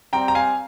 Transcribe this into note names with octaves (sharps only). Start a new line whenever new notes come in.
G3 C4 G5 A#5
A#5
F5 G#5